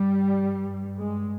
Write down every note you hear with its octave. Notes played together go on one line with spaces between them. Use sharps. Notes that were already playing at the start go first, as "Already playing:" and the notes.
Already playing: G2 G3
G#3